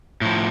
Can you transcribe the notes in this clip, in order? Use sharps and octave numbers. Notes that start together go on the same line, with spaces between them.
A2 F3